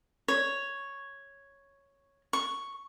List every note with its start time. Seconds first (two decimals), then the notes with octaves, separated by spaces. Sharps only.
0.28 C#5
2.33 C#6